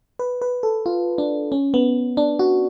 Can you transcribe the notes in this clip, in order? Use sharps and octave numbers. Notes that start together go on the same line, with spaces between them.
B4
B4
A4
F4
D4
C#4
B3
D4
F#4